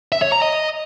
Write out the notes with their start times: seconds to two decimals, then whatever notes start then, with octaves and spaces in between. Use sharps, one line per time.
0.12 E5
0.22 C#5
0.32 A#5
0.42 D#5